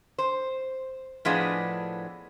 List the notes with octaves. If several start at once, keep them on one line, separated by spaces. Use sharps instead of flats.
C5
A2 F3 B3 D4 G#4 D#5